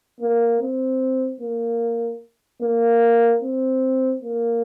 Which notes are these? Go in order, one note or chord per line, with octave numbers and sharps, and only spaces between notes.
A#3
C4
A#3
A#3
C4
A#3